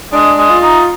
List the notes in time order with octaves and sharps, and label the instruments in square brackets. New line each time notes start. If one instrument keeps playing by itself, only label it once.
[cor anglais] G#3 [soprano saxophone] D4
[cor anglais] G#3
[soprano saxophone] F4
[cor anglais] D#4